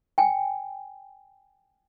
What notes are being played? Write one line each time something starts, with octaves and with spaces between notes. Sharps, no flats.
G5 G#5